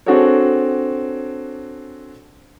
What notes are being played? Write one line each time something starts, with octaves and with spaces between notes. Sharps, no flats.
C4 D4 F#4 G#4 A4 C#5